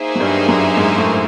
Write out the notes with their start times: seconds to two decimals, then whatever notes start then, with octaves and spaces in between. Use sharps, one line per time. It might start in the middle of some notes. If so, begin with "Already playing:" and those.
Already playing: A#3 D#4 G#4 C5 E5
0.15 F#3
0.20 G2 G3
0.48 F#2 F#3
0.77 G#2 G#3
0.97 A2 A3